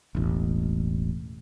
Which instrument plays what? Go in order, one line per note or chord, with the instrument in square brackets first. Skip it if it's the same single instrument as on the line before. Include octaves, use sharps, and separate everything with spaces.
[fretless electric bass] E1 A1